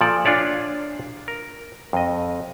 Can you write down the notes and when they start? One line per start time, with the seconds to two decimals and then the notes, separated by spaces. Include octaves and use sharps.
0.01 A#2 F3 A4 D5
0.25 D4 F4 C#5 D5 E5
1.28 A#4
1.93 F2 D#5